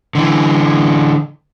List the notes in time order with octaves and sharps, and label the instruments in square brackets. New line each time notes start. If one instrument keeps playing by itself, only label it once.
[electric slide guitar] D3 E3